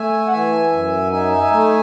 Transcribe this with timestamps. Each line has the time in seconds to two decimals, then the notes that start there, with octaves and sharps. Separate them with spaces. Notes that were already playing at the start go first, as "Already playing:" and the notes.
Already playing: A3 E5 G#5
0.28 F#5
0.32 E3 E5 G#5
0.72 F#2
1.11 D#4 E5 G#5
1.52 A3